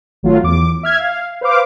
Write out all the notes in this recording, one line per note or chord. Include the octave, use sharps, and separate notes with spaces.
G#1 F#3 A3 F4
E2 D6
E5 F6 G#6
F5
B4 C5 F5 D6